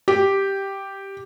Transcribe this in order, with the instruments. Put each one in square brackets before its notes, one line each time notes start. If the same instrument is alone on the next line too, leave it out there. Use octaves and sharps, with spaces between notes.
[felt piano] G4